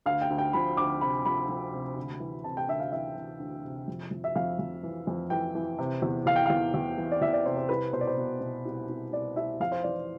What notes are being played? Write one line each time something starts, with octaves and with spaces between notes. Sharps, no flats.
D2 F5
G5
D2
G5
F3 B5
D2 D6
C3 B5
F3 B5
F3
C3
D2
E3
C3 A5
G5
D2 E5
F5
E3 E5
E3
D2
C3
F2
F2
E5
F2 F5
F2
E3
F2
E3 G5
E3
C3
E2
E2 F5
G5
E2 F5
E2
E3
D5
E2 E5
D5
C3 C5
C5
C2 B4
B2 C5
D5
C5
B2
B2
C2
C2
C2 D5
C2 E5
F2 F5
C5
E3 D5